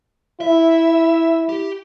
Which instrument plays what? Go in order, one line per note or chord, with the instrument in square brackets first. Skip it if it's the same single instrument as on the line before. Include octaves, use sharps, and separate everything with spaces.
[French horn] E4 [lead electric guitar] E5
[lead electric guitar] G4